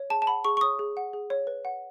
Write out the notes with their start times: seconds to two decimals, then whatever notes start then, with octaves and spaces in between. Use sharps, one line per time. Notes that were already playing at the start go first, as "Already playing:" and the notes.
Already playing: C#5
0.10 G#4 A5
0.22 A5
0.27 F#5 B5
0.45 G#4 C#6
0.57 C#6
0.61 C#5 D#6
0.79 G#4
0.97 F#5
1.13 G#4
1.30 C#5
1.47 B4
1.65 F#5